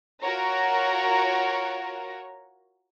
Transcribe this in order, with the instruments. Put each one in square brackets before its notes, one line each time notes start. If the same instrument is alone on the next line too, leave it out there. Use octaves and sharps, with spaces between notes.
[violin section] F4 F#4 A#4 C#5 A#5